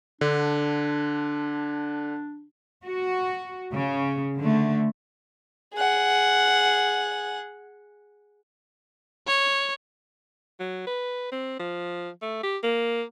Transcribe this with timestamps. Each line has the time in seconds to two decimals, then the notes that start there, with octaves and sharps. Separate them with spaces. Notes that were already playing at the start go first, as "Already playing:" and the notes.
0.21 D3 D4
2.83 F#4
3.73 C#3
4.38 D3 A3
5.74 G#4 F#5
9.27 C#5
10.60 F#3
10.87 B4
11.32 C4
11.59 F3
12.22 A3
12.43 G4
12.63 A#3